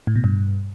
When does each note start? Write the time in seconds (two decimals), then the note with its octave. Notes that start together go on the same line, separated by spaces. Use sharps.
0.07 A2
0.16 B2
0.24 G2